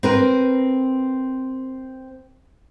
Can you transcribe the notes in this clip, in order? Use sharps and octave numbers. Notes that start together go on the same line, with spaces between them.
C4 A#4 B4